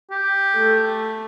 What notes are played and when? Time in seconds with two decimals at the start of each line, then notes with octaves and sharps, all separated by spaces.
0.11 G4
0.56 A3